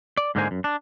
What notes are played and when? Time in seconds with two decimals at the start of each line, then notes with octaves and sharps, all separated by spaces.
0.17 D5
0.35 G#2 D3 G#3 A#3 C5 G#5
0.51 F#2
0.64 D4